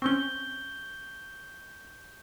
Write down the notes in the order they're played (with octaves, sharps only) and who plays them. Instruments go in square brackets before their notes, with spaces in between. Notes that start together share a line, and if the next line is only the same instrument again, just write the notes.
[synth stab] C4 C#4 [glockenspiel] C#6 G6 G7